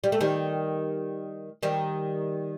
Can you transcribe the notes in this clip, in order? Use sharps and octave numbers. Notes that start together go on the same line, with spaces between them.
G3
A3
D#3 G3
D#3 G3